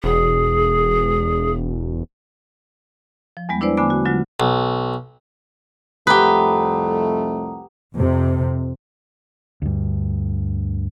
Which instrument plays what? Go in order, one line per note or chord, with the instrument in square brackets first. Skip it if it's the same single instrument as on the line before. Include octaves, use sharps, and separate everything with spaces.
[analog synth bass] E1 [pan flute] G#4
[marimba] F3
E2 G3 G#3 B3
D4 E4 B4 C5 D5
D3 A3 B3 G#5 D6
F#4
D3 F#3 G#3 F4
[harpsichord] B1
[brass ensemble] C2 F2 A3 [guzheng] G4 B4 [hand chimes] F#5 A#5 D#6
[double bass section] F2 C3
[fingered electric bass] D2 G2